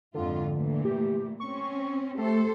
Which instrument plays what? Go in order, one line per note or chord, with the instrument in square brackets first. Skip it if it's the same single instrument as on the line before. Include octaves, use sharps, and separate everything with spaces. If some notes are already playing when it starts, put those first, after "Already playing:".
[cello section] F2 G#2 F4 [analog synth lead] D3
[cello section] A#2 E3 A3
[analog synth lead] G4
[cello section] C4 C#4 [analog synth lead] C#6
[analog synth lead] A3 [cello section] G4 A4 C5